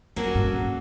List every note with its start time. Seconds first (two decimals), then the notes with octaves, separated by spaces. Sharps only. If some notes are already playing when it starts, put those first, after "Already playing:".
0.16 F#2 F#3 A#3 C#4 F#4 A4
0.35 G2
0.47 G2
0.53 G#2